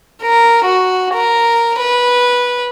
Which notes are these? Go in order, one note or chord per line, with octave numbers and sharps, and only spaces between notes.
A#4
F#4
A#4
B4